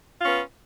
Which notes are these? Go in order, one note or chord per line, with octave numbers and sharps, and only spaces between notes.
B3 C#4 F4